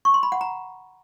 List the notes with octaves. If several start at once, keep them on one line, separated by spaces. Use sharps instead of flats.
C#6
C6
B5
F#5
A#5